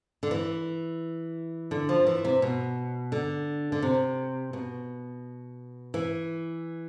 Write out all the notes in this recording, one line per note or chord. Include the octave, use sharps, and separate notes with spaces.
D3
E3
D3
F3
E3
C3
B2
D3
D3
C3
B2
E3